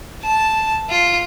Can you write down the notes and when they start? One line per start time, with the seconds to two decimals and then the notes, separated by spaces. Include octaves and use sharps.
0.22 A5
0.89 F4